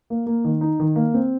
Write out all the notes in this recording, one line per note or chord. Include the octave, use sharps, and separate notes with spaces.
A#3
A#3
D#3
D#4
D#3
A#3
C4